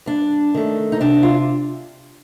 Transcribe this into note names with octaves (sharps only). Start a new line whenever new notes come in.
G2 D4
D#3 A3
D#4
C3 D4
F4